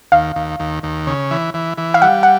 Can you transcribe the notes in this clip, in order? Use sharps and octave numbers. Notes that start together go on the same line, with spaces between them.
D#2 F5
D#2
D#2
D#2
C#3
E3
E3
E3
F5
G3 F#5
F#5